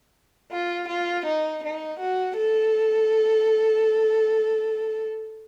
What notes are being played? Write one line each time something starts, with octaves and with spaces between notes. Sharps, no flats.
F4
F4
D#4
D#4
F#4
A4